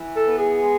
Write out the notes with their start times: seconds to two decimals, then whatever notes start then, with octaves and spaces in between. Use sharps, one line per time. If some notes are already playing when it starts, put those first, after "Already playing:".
Already playing: E3
0.16 A4
0.26 B3
0.37 G#4
0.60 G#3